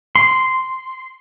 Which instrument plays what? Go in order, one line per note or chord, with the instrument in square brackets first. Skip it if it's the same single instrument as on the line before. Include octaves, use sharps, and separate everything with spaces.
[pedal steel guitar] C6